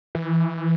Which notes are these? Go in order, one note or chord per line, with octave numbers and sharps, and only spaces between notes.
E3